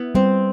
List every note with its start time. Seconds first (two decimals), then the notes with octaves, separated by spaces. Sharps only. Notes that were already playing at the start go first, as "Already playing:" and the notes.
Already playing: B3 E4
0.15 G3 C4